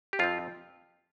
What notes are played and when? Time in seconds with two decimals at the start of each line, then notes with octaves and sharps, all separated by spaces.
0.13 G4
0.19 F2 F3 C4 F4